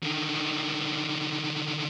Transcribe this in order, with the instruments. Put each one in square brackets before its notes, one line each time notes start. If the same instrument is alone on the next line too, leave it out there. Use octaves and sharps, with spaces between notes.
[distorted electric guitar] D3 D#3